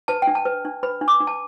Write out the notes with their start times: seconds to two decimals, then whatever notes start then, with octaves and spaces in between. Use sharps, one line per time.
0.08 B4 A5
0.22 G5
0.27 D4
0.35 A5
0.45 B4
0.65 D4
0.83 B4 B5
1.01 D4
1.08 D6
1.20 D4
1.27 A5